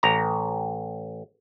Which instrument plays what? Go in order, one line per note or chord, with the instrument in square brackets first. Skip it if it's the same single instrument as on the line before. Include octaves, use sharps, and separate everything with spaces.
[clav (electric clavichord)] A1 A#5